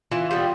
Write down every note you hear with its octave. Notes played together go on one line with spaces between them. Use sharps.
E3 F4
G3 B3 F4